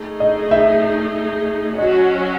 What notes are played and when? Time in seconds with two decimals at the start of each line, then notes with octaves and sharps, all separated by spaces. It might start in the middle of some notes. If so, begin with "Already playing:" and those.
Already playing: A3 D#4 G#4
0.20 D#5
0.51 E5
1.78 F#3 C#4 F#4 D#5